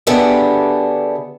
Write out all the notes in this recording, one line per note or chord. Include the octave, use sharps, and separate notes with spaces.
D3 A3 B3 D4 G4 G#4